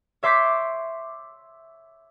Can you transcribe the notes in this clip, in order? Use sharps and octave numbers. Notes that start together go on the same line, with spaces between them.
C#5 E5 C6 D6 G6 B6